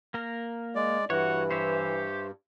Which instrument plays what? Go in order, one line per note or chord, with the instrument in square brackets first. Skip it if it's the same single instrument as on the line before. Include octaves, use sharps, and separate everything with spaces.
[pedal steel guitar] A#3 A#4
[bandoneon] G#3 D5
[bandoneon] G2 [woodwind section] E3 [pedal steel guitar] F#4 C#5 [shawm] F#5
[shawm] G4 [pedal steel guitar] C5 C#5 E5